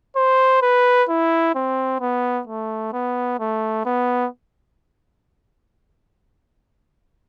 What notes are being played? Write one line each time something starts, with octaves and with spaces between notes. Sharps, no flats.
C5
B4
E4
C4
B3
A3
B3
A3
B3